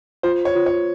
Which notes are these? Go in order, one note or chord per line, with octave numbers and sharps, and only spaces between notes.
F4 C5
C#5
F4
C#5